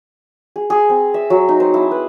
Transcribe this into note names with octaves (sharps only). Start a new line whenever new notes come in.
G#4
G#4
C4
E5
F#3
D#4
C5
E4
B4